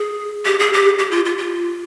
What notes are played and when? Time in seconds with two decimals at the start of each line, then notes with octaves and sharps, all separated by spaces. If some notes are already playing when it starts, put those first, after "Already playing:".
Already playing: G#4
0.45 G4
0.59 G#4
0.73 G4
0.99 G4
1.11 F4
1.25 F4
1.38 F4